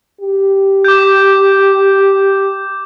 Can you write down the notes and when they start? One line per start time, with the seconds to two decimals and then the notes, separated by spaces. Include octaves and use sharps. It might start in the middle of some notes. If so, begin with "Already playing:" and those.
0.21 G4
0.84 D6 G6